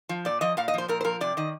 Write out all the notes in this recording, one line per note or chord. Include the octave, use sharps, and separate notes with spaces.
F3
A#2 D5
F3 D#5
A#2 F5
D#5
F3 C5
A#2 A#4
C5
F3 A#4
C3 D5
D#3 D#5